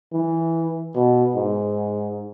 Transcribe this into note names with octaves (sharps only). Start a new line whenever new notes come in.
E3
B2
G#2